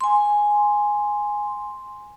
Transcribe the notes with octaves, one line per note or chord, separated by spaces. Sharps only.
G#5 C6